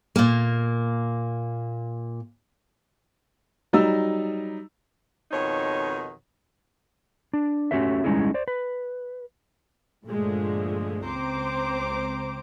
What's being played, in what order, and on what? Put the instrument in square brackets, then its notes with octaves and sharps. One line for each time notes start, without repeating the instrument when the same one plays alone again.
[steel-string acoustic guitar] A#2 A#3
[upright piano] F#3 G3 D#4 D#5 E6
[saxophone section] F2 B2 D#3 D#4 C#5
[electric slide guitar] D4
A3 C#4 F#4 G4 B4 E5
G3 G#3 C#4 D#4 E4 G#4
C5 D5
B4
[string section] G2 A#2 D3 F3 G#3 A3
C#2 C4 C5 A#5 D6